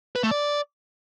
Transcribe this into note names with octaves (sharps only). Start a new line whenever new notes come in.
B4
A3
D5